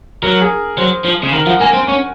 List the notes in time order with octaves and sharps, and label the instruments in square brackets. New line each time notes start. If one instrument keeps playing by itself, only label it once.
[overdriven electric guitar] F#3 [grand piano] A#4
[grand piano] G#4
[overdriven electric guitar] F#3 [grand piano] C5
[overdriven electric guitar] F3
C#3
[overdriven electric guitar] D#3 [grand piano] A#4
[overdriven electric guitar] F3 [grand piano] F#5
[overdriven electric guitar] A#3 [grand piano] G#5
[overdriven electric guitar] C4
C#4